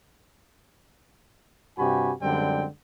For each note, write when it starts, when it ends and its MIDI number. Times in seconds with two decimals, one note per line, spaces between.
1.78 2.12 43
1.78 2.12 48
1.78 2.12 66
1.78 2.12 67
1.78 2.12 80
1.78 2.12 83
2.21 2.66 42
2.21 2.66 50
2.21 2.66 55
2.21 2.66 56
2.21 2.66 60
2.21 2.66 79